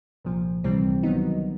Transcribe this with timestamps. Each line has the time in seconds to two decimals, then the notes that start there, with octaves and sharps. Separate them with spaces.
0.24 C2 A#2 F3
0.64 C#2 C3 E3 G3 C4
1.03 D#3 F#3 B3 D#4